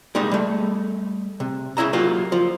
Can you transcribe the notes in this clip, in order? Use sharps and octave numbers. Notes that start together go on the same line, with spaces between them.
G3 G#3 A#3 D#4
G3 A3
C3
C#2 C#3 E4 E5 A#5
F#3 A#3 F4 G4
F3